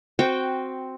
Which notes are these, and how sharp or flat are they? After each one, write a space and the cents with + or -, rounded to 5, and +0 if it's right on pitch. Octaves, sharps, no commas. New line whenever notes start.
C4 +0 F#4 +0 G5 -5